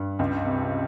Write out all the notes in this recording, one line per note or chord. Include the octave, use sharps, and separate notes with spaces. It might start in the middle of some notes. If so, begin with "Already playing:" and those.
Already playing: G2
C#2
C3